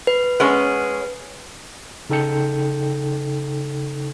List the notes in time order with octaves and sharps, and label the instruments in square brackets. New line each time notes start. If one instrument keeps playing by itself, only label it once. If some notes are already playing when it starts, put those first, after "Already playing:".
[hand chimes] B4
[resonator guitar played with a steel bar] G#3 B3 C#4
[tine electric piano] C#3 D#4 A4 G5 G6 C#7